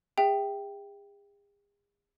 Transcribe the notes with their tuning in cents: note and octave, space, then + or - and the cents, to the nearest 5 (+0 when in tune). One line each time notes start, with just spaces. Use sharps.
G#4 -40 E5 +0 G5 +0